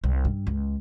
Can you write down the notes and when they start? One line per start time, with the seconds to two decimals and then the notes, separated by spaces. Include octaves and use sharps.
0.04 C2
0.25 G2
0.47 C#2